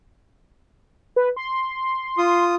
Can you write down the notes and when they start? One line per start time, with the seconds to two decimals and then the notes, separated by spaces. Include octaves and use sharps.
1.16 B4
1.36 C6
2.18 F4 D#6